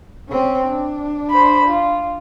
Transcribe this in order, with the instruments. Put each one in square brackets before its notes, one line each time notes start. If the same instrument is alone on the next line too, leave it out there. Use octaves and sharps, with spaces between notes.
[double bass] C4 C#4
D4
[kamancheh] C5 B5
F4